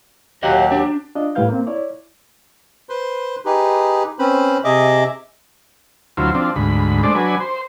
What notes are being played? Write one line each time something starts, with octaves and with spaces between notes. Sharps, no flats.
D#2 F#3 G4 D#5 F5 F#5
D4
D4 F4 D#5
A2 G3 E4 B4 F5 G6
A#3 C4
E4 C#5 D5
B4 C5 C6
D#4 G4 G#4 B4
C4 C#4 B4 C5 B5
C3 G#4 D#5 E5 D6
D2 F#3 E4 F4 C5
F3 C4 D4
D2 G#2 B5
G#3 A3 D4 C5 D5
F#3 D4 B4 G#5
C5